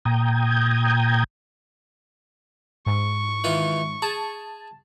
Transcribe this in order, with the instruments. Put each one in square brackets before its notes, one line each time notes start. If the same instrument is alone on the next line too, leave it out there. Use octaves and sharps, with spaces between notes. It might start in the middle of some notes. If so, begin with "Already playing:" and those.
[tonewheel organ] A#2 G5 A#5 D#6 G6 G#6
[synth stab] G#2 [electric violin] C#6
[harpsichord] D#3 E3 F4
[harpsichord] G#4 [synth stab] A5